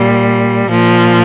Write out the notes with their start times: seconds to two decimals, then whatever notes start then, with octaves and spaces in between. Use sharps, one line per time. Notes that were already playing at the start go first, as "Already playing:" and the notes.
Already playing: A#2 G3
0.70 A#2 F3